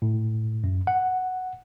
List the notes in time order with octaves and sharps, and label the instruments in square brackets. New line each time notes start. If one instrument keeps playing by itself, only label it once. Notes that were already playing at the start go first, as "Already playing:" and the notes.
[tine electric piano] A2
F#2
F#5